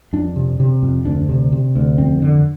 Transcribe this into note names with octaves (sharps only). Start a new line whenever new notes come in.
F2 D4
C3
C3
F2
D2 D4
C3
C3
D2
F2 C4
D3